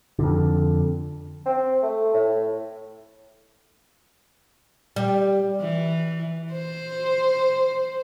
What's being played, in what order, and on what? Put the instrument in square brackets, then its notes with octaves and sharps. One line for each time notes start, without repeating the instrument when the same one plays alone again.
[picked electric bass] F2 D3
[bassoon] C4
A3
A2
[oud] G3
[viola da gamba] E3
C5